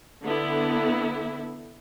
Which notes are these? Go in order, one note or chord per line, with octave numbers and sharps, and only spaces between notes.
D3 B3 E4